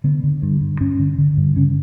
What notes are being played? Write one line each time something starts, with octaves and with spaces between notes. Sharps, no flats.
D3 B3
D3
G2
G2
G2 C#4
D3
D3
G2
C#3 C#4